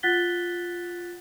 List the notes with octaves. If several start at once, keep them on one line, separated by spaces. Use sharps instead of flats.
F4 F#5 F#6 A6 B6 G7